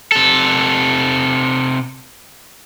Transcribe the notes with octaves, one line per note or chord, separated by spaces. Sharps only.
C3 A4